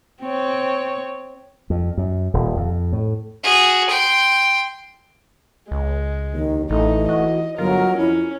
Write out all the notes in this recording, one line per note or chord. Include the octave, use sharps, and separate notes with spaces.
C4 C#5
F2
F#2
D#1
F2
A2
F#4 G#4
G5 C6
C#2 G#3
D#2 D#3
A1 E3 A3 D#4
F#4 D#5
G1 F#3 F4 A#4
F2 C#4 E4